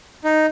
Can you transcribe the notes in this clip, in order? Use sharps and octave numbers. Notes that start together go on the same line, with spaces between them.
D#4